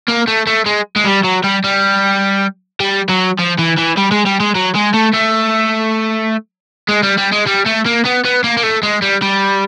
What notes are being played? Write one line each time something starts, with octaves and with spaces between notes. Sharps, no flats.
A#3
A3
A3
G#3
G#3
G3
F#3
G3
G3
G3
F#3
F3
E3
E3
G3
G#3
G3
G#3
F#3
G#3
A3
A3
G#3
G3
G3
G#3
G3
A3
A#3
B3
B3
A#3
A#3
A3
G#3
G3
G3